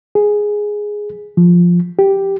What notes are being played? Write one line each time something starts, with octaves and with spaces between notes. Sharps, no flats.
G#4
F3
G4